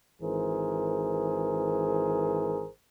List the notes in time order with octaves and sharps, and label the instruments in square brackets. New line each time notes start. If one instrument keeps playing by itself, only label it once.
[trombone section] G#1 E3 G#4 A#4 C5